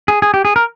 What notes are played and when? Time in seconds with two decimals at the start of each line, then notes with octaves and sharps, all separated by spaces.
0.08 G#4
0.22 G#4
0.34 G4
0.45 G#4
0.56 A#4